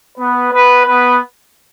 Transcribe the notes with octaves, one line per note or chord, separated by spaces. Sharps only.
B3 B4
B3 B4
B3 B4